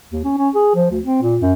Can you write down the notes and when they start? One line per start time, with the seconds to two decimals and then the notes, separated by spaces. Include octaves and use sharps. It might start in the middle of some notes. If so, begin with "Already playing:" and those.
0.11 D#2
0.24 C#4
0.37 C#4
0.55 G#4
0.75 F3
0.91 D2
1.03 C4
1.22 A#2
1.41 F#2